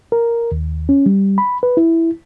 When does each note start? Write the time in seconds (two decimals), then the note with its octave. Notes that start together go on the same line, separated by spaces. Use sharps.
0.12 A#4
0.52 D#2
0.89 C#4
1.06 G3
1.38 B5
1.63 B4
1.77 E4